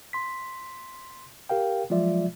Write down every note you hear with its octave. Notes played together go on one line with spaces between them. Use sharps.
C6 B6
G4 A#4 F5 G5
F3 F#3 G#3 F4 D5 E5